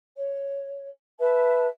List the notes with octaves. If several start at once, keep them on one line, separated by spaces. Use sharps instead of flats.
C#5
B4 E5 A5